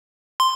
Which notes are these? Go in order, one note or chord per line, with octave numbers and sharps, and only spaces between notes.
C6